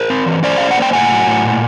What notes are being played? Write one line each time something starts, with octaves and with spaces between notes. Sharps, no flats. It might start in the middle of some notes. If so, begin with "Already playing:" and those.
Already playing: A#4 C5
C4
E3
C#4 C5 D5
C#4 F5
F#5
A#3
G5
A2 F#5 G#5
F#3
A2
A#2